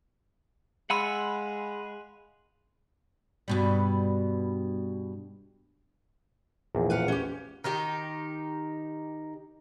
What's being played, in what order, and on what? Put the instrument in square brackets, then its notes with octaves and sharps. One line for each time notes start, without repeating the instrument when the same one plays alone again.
[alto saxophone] G#3 [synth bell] F5 B5 C6 [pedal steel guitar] F#5 G#5 E6
[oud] G2 B2 G3
[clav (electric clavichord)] A#1 E2
[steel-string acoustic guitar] B4 F5 F#5
C#4 G4
[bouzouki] D#3 D#4 G4